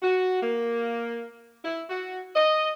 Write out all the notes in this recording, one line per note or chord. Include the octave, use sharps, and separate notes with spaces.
F#4
A#3
E4
F#4
D#5